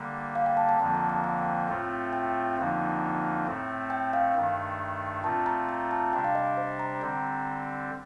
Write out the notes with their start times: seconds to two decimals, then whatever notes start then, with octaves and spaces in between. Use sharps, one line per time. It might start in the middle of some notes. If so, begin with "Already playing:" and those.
Already playing: D3 G3 A#3
0.35 F5
0.46 G5
0.57 A5
0.69 A5
0.79 F2 D3 F3 A#3 A5
0.95 A#5
1.09 A#5
1.24 G5
1.69 A2 A3 C4 F4
2.13 G5
2.57 F2 D3 F3 A#3 D#4
3.46 A2 A3 C4
3.90 G5
4.13 F5
4.34 G2 D#3 A3
5.23 A#2 A3 C4 F4 A5
5.46 A#5
5.69 A#5
5.91 A5
6.13 C3 G3 D4 G5
6.24 F5
6.35 D#5
6.57 C5
6.79 A#5
7.01 D3 G3 C4 A#5